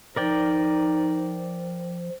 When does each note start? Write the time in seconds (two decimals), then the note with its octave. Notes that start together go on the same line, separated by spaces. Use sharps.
0.16 F3 D#4 A#4 D5 G5